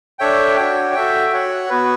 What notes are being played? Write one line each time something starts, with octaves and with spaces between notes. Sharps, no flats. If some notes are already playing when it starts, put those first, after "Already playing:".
D4 A4 C#5 E5 G5
D4 F#4 C#5 G5
F#4 A4 E5 G5
F#4 C#5 F#5
B3 F#4 B4